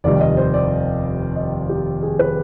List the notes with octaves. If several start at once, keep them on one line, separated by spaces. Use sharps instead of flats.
F1 D#2 D#3 G3 D5
D#5
C5
D5
D#5
G4
G#4
B4